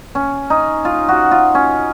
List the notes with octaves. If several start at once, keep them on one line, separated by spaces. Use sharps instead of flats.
C#4
D#4
F4
F#4
F4
C#4